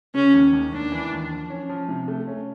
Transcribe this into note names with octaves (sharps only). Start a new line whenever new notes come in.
C#3 C#4
D#2
D#2
D#2 D4
E3
D#2
F3
C#4
F3
C3
A3
C#4